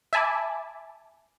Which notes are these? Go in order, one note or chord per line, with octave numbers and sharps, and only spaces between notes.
E5 G#5 A5 B5 D6